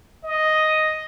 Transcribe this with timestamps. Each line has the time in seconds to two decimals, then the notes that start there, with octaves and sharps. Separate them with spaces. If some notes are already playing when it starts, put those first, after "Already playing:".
0.23 D#5